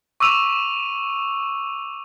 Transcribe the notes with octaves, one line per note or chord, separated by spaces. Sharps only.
C#6 D6 E6 D#7 F7